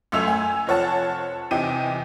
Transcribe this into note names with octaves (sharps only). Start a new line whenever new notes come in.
C#2 F#2 A3 E6 F7
G#5
F1 F3 C#5 F#5 A5
E2 C3 D#4 G5 D#7